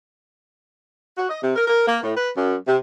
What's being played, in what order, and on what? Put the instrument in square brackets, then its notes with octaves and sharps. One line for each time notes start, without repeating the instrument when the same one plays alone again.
[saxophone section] F#4
D#5
C3
A#4
A#4
A#3
A2
B4
F#2
C3